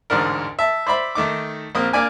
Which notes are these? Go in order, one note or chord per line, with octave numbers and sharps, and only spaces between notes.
A1 D2 G#2 D4 A#4
E5 A5
C5 D5 E5 B5
D#3 A3 D#4 D6
A#1 A#3 C4 D#6
A#3 D4 D5 G#5